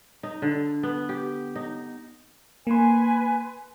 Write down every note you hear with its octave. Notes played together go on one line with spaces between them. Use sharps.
D#4
D3
B3
G4
D#4
A#3 B4 G#5 C6